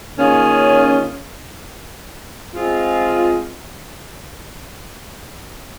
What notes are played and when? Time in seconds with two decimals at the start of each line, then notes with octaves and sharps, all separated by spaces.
0.16 D#3 A#3 C#4 F4 G#4
2.52 G#3 C4 F4 G#4